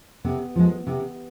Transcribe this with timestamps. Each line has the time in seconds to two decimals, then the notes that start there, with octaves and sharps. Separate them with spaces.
0.24 C3 B3
0.56 F3 G#3
0.87 C3 B3